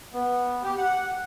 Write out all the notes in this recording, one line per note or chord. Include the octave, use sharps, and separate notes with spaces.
B3
G4
F#5